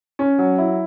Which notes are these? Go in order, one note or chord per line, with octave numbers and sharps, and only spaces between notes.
C#4
F#3
E4